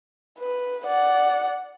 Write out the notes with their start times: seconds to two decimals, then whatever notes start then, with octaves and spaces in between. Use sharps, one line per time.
0.39 B4
0.86 D5 F#5